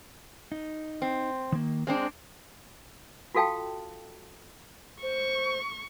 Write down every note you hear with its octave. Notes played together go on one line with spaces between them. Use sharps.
D#4
C4
D#3 A#3
G#3 C4 D4 C5
F4 F#4 A4 F5 G5 A5
C5 C#6